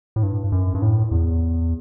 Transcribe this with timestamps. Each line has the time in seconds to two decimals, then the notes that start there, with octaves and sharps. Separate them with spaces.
0.16 A2
0.23 G2
0.52 F#2
0.75 G2
0.82 A2
1.11 E2